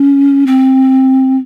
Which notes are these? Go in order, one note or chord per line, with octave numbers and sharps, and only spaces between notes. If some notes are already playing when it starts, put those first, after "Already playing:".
Already playing: C#4
C4